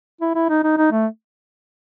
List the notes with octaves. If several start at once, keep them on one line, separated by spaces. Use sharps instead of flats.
E4
E4
D#4
D#4
D#4
A3